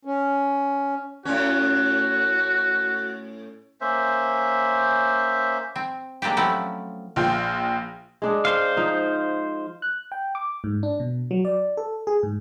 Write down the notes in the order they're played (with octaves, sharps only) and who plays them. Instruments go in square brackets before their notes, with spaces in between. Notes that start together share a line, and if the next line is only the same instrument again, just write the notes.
[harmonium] C#4
[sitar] A2 C#4 [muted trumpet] F#4
[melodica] A#3 C#4 C5 E5
[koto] C4
G#3 A#3 C4 D4 G4
F3 F#3 A3 C4 C#4 E4
[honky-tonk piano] A#1 F4 G5
[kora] G#3 D4 G#4
[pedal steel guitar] C5 F5
[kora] F3 D#4
[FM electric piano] F#6
G5
D6
G#2
D4
B2
F#3
D5
A4
G#4
G#2